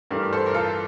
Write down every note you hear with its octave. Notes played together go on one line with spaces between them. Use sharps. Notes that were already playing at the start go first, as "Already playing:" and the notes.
G2 E3 A3 D4 G4 A#4
A4 C5
A#4
F4 A4